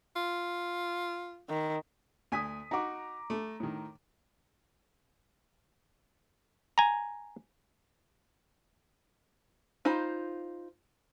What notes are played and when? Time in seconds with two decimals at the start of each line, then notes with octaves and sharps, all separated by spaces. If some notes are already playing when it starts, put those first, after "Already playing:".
0.16 F4
1.50 D#3
2.32 D2 G#5 D#6 B6 D#7
2.71 D#4 F#4 A#5 D6
3.30 A3
3.60 A2 D#3
6.78 G#5 A#5
9.85 D#4 F4 C5 B5